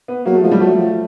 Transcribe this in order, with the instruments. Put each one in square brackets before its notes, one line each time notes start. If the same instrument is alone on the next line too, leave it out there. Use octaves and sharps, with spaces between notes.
[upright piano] B3
[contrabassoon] F#3 [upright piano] A#3
[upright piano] A3
[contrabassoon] F3 [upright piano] G#3
[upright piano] G3
[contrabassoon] F#3 [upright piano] A3
[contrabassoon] F3